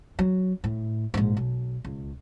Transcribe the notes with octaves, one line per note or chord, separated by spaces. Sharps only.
F#3
A2
A#1 G#2
B1
C#2